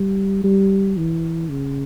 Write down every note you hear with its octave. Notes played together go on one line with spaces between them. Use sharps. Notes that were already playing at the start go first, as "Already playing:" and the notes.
Already playing: G3
G3
E3
C#3